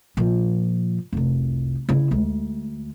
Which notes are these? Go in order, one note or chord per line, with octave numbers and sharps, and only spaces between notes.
A#2 F3
F1 C2
C#3 E4
D2 G#3